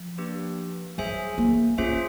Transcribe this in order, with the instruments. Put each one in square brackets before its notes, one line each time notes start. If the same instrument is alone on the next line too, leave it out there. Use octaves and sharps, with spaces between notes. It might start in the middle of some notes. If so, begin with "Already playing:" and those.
Already playing: [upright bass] F3
[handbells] A#3 D4 G4 B4
[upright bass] F#3 [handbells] G#4 C5 E5 G#5
[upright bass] A#3
[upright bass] A#3 [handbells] C#4 F4 G#4 C5 E5